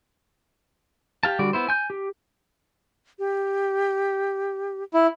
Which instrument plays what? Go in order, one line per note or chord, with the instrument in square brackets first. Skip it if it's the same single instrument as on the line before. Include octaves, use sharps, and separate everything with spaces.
[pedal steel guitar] G4 F5 A5
D3 G3 F#4 D5
B3 E4 C5
G#5 G6
G4
[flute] G4
[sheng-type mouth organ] E4